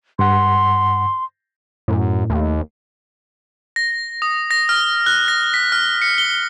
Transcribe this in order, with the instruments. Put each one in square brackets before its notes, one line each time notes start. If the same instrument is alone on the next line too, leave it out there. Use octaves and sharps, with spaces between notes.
[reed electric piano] G2 F#5 [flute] C6
[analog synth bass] F#2 [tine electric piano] A2
[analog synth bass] D#2 [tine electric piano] A3
[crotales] A#6
D#6
A#6
F6
F#6
A#6
B6
F6
C#7
G7